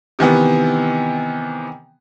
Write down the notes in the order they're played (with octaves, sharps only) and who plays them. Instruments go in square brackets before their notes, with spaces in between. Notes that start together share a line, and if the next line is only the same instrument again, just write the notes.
[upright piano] C3 D#3 E3 B3